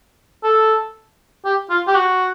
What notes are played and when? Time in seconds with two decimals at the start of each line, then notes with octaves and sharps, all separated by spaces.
0.43 A4
1.45 G4
1.70 F4
1.87 G4
1.95 F#4